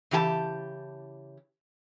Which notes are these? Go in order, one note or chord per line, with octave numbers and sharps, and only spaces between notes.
C#3 E3 G4 G#5 A5